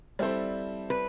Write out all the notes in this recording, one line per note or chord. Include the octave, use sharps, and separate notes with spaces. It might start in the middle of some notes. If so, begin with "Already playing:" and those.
G3 C4 E4 A4 C5
B4